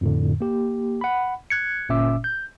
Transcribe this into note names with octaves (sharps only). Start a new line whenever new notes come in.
F2 A2 D3
A#3 G4
F#5 B5
F#6 G#6 C#7
G1 A#2 C#4 E5 D6 E6
G6